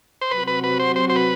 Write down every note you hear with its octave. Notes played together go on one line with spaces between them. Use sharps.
C5
C3 F#3 C4 F#4 B4
B4
B4
C5
C5
C5
B4